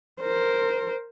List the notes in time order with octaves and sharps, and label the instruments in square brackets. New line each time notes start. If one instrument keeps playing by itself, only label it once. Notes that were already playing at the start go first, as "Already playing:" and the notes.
[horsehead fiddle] A#4 C5